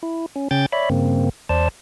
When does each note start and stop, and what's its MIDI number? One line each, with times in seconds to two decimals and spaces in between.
0.03 0.26 64
0.36 0.48 61
0.51 0.66 49
0.51 0.66 61
0.51 0.66 79
0.51 0.66 91
0.51 0.66 93
0.72 0.89 73
0.72 0.89 74
0.72 0.89 76
0.72 0.89 83
0.90 1.29 43
0.90 1.29 49
0.90 1.29 58
0.90 1.29 60
1.49 1.69 40
1.49 1.69 72
1.49 1.69 74
1.49 1.69 81